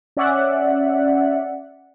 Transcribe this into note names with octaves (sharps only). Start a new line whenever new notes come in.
C#4 D5 E5 F#5